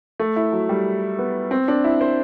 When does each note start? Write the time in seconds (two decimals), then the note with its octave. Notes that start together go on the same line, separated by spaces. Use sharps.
0.20 A3
0.36 E4
0.52 F#3
0.69 G3
1.19 B3
1.51 C4
1.68 D4
1.84 E4
2.01 C5